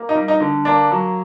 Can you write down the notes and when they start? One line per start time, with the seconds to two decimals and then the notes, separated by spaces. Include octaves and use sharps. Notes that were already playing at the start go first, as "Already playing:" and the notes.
Already playing: A#3
0.09 D#4
0.15 G3
0.28 D#4
0.40 D3
0.65 A#3 D4
0.91 F#3